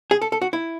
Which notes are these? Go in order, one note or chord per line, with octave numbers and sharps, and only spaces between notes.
G#4
A4
A4
F#4
E4